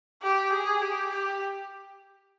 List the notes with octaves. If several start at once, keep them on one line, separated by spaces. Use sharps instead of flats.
G4
G#4
G4
G4